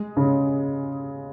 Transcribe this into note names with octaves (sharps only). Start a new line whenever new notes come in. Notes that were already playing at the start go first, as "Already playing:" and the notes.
Already playing: G#3
C#3